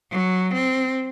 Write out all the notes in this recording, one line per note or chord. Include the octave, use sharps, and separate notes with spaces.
F#3
C4